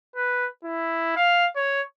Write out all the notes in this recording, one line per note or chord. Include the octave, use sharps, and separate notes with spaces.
B4
E4
F5
C#5